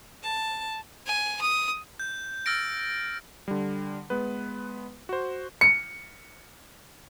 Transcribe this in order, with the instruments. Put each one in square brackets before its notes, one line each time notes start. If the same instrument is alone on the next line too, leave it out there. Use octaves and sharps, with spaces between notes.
[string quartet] A5
[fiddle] G#5
D#6
[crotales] G6
E6 F6 A6 A#6 D7
[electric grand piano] D3 G3
G#3 B3 B4
F#4 C5
[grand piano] C#7